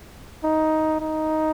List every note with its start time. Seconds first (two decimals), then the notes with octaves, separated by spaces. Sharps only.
0.44 D#4
1.01 D#4